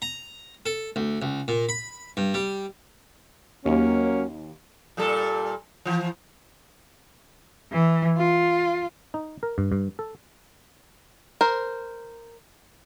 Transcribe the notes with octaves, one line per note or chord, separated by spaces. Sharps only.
A#5
A4
D2
C#2
A#2
B5
G2
G3
D#2 F#3 A#3 C#4
A#2 G3 A4
E3 F3
E3
F4
D#4
A#4
G2
G2
A4
A#4 C5